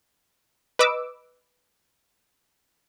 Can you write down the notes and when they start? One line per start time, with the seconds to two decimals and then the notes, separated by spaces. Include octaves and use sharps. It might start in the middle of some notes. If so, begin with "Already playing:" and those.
0.79 B4 D#5 D6 E6